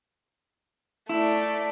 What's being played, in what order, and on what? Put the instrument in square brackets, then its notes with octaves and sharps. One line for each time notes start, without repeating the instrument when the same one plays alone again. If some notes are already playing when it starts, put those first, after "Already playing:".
[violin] A3 D5 [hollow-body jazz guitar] E4